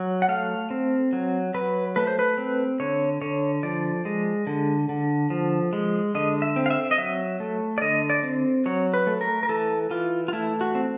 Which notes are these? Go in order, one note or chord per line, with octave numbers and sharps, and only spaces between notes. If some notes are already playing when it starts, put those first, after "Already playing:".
Already playing: F#3
F#5
A3 F5
C4
F#3
F#3 B4
A3 B4
C5
B4
C4
D3 C#5
D3 C#5
F3 D5
G#3
D3
D3
F3
G#3
D3 D#5
E5
C4
F5
E5
D#5
F#3 E5
A3
D5
D3 D#5
D5
C4
F#3 C#5
B4
A3
A#4
A#4
E3 A4
E3 F4
F4
A3 E4
F#4
C4